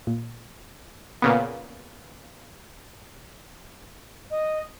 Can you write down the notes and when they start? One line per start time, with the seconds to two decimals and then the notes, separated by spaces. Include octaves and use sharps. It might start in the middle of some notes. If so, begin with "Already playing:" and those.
0.07 A#2
1.22 A#2 C#3 B3
4.30 D#5